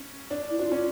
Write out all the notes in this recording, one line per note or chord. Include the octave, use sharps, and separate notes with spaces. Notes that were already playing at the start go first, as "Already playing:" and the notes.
Already playing: C#4
D4
E4
D4 F4 F#4
C#4